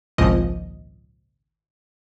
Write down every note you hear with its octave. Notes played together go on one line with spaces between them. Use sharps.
G#1 C#2 A#2 F3 D#5